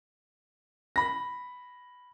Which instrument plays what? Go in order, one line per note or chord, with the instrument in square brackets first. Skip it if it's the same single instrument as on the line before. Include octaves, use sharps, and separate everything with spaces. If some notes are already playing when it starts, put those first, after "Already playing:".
[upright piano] B5 A#6